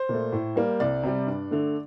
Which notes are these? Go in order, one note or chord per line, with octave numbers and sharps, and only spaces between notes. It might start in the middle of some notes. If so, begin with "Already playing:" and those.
Already playing: C5
A#2 A3
A2
G3 A#3
C2 D5
C3 G3
G2
D3 A3